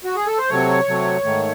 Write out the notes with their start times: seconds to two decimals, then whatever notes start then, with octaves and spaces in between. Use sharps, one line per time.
0.04 F#4
0.16 G#4
0.27 A4
0.39 C5
0.49 C3 F#3 A3 C#5
0.88 C3 F#3 A3
1.24 G#2 D#3 A3